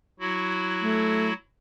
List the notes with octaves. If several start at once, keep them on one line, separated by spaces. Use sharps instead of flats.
F#3 E4 F#4
A3